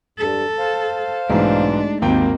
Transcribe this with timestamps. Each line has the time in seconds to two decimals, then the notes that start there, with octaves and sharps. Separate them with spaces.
0.19 G2 A4
0.59 C5 F5
1.30 B1 G#2 E3 G#3 A3 D4 D#4
2.02 G#1 D#2 A#3 C4 G5